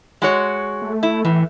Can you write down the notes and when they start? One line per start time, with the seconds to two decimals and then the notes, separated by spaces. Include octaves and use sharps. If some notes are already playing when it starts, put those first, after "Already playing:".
0.22 G#3 F#4 C#5
0.82 A3
1.03 E4
1.25 A2 E3